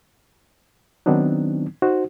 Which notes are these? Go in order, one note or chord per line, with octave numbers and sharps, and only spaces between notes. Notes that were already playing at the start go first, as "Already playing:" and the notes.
D#3 F#3 B3 C4 D4 D#4
D#4 F#4 C5